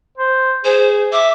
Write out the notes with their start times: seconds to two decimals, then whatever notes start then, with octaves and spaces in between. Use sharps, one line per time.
0.17 C5
0.65 G#4 C5
1.13 E5 D6